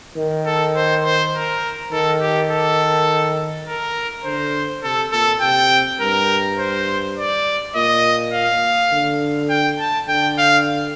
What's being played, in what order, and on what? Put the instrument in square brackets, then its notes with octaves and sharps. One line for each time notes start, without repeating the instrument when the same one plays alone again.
[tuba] D#3
[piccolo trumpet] A4
C5
C5
A#4
[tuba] D#3 [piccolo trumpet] A4
[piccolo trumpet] G4
A4
A#4
[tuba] D3 [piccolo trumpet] C5
[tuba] C3 [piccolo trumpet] A4
[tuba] A#2 [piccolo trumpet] A4
[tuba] C3 [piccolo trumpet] G5
[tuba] G2 [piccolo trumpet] A#4
[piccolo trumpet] C5
D5
[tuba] A#2 [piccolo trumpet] D#5
[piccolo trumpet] F5
[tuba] D3
[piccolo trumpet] G5
A5
[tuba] D3 [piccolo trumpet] G5
[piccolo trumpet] F5